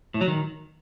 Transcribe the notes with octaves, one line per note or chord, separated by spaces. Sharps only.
A2
F#3
D#3